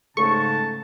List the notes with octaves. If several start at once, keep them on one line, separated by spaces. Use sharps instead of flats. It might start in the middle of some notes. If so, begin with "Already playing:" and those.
G#2 C#3 A3 A4 A5 C#6